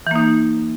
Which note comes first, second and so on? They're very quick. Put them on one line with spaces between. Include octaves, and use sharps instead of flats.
E3 A#3 D#4